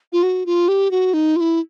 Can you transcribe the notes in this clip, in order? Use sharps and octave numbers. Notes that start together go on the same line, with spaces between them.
F4
F#4
F4
G4
F#4
D#4
F4
E4